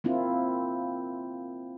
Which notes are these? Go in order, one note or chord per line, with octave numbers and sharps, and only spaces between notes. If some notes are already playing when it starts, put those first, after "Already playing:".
A#3 C4 E4 F4